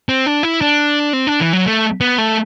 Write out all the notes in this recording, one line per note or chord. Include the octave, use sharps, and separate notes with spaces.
C4
D4
E4
D4
C4
D4
E3
F#3
A3
B3
A3